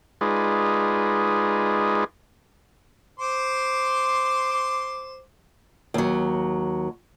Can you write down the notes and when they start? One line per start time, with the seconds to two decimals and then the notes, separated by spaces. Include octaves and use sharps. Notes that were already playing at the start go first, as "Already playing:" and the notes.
0.21 G#3 D#4 F4 G#4 B4 D5
3.20 C5 C6 D6
5.94 D#2 F#3